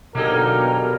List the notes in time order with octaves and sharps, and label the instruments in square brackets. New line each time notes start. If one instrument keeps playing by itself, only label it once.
[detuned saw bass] B2 [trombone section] D3 F#3 G4 [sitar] A#3 D#4 A4 [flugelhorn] A#4